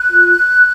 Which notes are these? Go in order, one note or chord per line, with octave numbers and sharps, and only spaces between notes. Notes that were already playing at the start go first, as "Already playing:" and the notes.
Already playing: F#6
F4